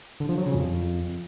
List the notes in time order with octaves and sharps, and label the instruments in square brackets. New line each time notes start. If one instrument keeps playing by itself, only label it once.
[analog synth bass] D3
F3
F#3
C#3
F2